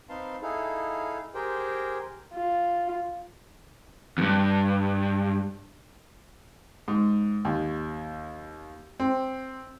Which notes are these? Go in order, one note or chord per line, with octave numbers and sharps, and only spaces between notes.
C4 D#4 B4 F5 A5 C6
D#4 E4 G#4 A4 F5
G4 G#4 A#4 C5 G5
F4
E2 G2
G#2
D#2
C4